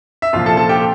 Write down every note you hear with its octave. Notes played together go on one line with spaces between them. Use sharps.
E5
C2 A#2 F3 F4 F5
A4 A5
A4 A5
G4 G5